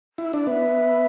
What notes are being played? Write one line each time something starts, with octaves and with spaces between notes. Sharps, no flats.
E4
D4
B3 E5
B5